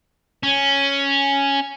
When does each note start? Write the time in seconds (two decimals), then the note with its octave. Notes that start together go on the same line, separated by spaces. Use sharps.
0.43 C#4